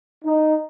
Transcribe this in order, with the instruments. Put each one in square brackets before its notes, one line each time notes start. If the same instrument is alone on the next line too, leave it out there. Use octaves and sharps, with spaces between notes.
[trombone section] D#4